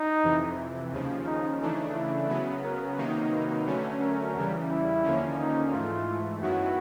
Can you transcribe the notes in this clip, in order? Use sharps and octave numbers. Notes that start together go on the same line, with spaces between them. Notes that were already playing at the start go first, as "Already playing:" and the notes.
Already playing: D#4
F2 C3 E3
D#2 C#3 F3
D#4
C#3 E3 A3 D4 D#4
E4
C#3 F#3 B3
A#4
C3 D#3 F#3 A#3 D#4
B4
D3 F#3 A3 C#4
A#4
E2 C#3 E3 G3
E4
D#2 D3 F3 A#3 C#4
D#4
G#2 E3 A3 F4
F#2 D#3 F#3 B3 E4 F#4